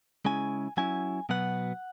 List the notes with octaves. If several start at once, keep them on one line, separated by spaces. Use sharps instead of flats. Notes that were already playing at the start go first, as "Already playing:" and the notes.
C#3 G#3 C#4 E4 G#5
F#3 C#4 E4 G#5
B2 F#3 B3 F#5